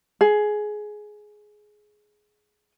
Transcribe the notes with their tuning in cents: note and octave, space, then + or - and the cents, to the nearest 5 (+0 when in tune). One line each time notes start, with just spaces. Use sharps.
G#4 +15